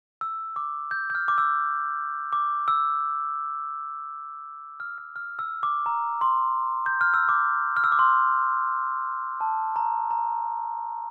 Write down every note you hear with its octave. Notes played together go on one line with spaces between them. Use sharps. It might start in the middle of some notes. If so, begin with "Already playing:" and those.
E6
D6
G6
G6
F6
D6
E6
D6
E6
F6
F6
F6
E6
D6
A#5
C6
G6
F6
E6
D6
F6
E6
D6
C6
A5
A#5
A#5